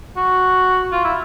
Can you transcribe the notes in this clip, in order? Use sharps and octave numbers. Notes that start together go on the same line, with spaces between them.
F#4
F4
E4